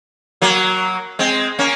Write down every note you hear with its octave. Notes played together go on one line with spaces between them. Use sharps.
F#3 A#3
G#3 C4
A#3 C#4